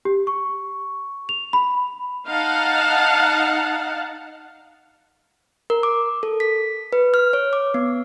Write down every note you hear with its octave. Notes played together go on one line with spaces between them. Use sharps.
G4
C#6
F7
B5
D#4 F5 F#5 A5
A#4
D6
A4
B6
B4
F6
C#5
D6
B3